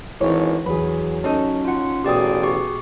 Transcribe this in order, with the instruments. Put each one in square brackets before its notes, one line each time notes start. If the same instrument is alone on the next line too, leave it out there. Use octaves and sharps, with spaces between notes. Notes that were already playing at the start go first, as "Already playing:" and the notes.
[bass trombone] G#1 [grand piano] E3 [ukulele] C#5
[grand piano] E2 G#4 [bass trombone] F#3 [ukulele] B4
[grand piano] C#4 [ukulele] D#4 A4
[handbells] F4 F#5
[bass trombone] A1 [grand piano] B2 G#4 D#6 [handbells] G4 D5 G5
[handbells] G4 C#6